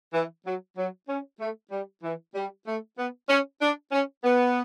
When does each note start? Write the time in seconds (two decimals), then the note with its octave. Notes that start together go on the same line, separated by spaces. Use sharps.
0.13 E3
0.45 F#3
0.77 F#3
1.08 C#4
1.40 A3
1.71 G3
2.03 E3
2.35 G3
2.66 A3
2.97 B3
3.28 C#4
3.61 D4
3.92 C#4
4.24 B3